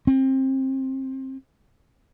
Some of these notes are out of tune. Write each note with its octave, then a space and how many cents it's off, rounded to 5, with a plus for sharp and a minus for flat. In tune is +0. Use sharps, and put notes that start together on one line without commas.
C4 +25